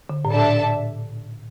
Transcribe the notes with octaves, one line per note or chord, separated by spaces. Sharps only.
D3
A2
A#2 D4 A4 E5 A5